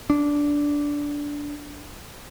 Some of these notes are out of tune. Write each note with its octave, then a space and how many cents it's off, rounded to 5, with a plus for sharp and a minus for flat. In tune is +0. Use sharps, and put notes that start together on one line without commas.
D4 -10